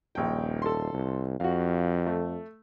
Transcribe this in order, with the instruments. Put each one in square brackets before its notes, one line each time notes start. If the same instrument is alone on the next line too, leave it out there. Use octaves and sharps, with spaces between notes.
[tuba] D#1 [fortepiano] A#1 G5
[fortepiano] A4 C6
[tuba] C2
[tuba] F2 [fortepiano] F#4 F5
[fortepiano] A3